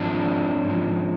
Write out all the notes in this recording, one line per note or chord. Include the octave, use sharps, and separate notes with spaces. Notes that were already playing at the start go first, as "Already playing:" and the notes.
Already playing: G#2 F3 C4 D4
G#2 F3